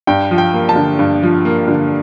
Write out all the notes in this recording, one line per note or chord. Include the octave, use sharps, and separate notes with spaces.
G2 G5
F3
G5
A#3
A5
D3
G2
F3
A#3
D3